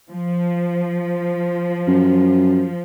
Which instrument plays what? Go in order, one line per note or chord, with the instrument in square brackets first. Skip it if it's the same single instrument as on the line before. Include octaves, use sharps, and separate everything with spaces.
[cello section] F3
[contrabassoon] F#2